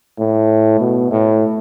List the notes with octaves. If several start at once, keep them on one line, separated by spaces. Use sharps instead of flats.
A2
B2
A2